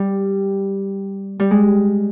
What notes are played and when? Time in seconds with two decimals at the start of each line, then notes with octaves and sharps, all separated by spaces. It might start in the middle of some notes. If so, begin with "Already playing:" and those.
Already playing: G3
1.40 G3
1.51 G#3